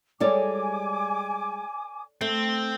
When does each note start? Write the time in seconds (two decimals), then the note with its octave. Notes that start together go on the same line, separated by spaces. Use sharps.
0.20 G3 G#3 A4 C#5 D5 G#5 D6
2.21 A3 C4